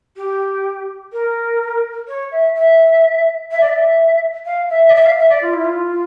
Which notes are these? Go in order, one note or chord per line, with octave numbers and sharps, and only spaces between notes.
G4
A#4
C#5
E5
E5
E5
D5
E5
F5
E5
D5
E5
F5
E5
D5
F4
E4
F4